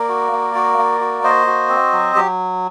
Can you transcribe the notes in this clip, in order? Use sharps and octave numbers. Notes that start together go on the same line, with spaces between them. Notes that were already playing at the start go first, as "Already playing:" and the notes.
Already playing: A#3 A#4 D5
F#4
A#3
F#4
A#3
F#4
A#3 C5 D#5
F#4
C4
F#3
F#3 G4